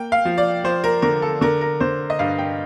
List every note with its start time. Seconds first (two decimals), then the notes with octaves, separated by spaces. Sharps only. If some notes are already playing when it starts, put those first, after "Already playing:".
Already playing: A#3 G5
0.12 F5
0.25 F3
0.38 D5
0.64 F3 C5
0.84 A#4
1.02 D3 A#4
1.22 A4
1.41 D3 A#4
1.61 A#4
1.80 D3 C5
2.10 D#5
2.19 G2 F5
2.39 G5